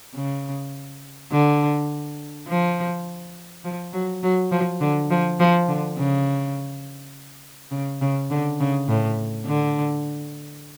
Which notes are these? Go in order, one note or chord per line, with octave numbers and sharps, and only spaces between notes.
C#3
D3
F3
F3
F#3
F#3
F3
D3
F3
F3
D3
C#3
C#3
C#3
D3
C#3
A2
D3